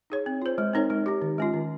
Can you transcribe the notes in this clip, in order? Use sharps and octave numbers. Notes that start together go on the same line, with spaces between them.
D#4 G#4 C#5
C4
F4 C5
G#3
C4 D#4 A#4 C#5
G#3
D#4 G4
D#3
G#3 C#4 F4
D#3